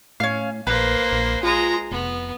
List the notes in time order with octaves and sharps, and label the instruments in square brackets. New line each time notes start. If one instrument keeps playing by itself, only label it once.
[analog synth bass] A2 [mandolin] C#4 F5
[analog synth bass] A#1 [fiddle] A#3 C5 [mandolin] B4
[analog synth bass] A#1
[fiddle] G#3 A#5 [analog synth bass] F4
[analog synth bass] F1 [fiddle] B3